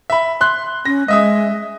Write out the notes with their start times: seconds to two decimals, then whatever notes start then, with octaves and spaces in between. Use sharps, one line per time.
0.10 E5 B5
0.41 C6 F#6
0.85 C#4 A#6
1.08 G#3 D#5 E5 D#6